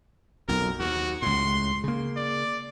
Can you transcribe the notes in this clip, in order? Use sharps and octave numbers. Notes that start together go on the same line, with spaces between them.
B1 F2 A#4
D#2 F#4
C#2 A2 C6
C#3 A#3
D5